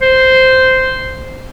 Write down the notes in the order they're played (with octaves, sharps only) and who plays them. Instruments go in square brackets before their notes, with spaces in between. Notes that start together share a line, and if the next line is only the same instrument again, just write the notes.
[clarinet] C5